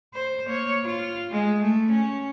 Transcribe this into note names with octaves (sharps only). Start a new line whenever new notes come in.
C5
A#3 C#5
F4
G#3
A3
C#4